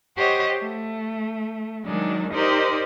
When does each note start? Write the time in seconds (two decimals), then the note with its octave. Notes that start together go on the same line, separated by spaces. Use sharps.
0.16 G4 C5 C#5 D#5 F#5
0.57 A3
1.85 D#3 F#3 G#3 D4
2.32 D#4 G4 A#4 C5 D5 D#5